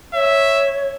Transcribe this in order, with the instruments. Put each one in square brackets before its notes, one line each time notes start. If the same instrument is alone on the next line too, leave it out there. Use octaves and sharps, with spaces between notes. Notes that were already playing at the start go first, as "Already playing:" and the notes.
[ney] C#5 [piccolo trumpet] E5